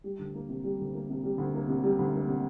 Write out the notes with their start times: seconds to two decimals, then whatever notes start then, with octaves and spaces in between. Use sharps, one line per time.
0.04 G3
0.19 D2
0.34 A#3
0.49 C3
0.64 G3
0.79 D2
0.93 A#3
1.09 C3
1.24 G3
1.38 D2
1.54 A#3
1.68 C3
1.84 G3
1.99 D2
2.13 A#3
2.28 C3